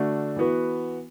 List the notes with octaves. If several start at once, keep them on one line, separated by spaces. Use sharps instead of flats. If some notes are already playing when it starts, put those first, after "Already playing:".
Already playing: D3 A3 D4 F#4
E3 B3 F#4